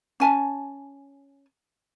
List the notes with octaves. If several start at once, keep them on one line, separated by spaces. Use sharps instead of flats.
C#4 G#5 A5